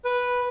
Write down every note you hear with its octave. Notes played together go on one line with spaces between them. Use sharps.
B4